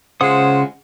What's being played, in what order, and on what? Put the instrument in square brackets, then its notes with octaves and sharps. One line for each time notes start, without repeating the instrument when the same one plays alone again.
[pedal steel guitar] C#3 F#5 D#6 [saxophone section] G#3 F4 C5